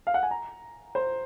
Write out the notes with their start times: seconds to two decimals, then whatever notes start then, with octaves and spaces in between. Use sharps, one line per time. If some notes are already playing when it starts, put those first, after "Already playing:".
0.07 F5
0.14 F#5
0.23 G#5
0.31 A#5
0.95 C5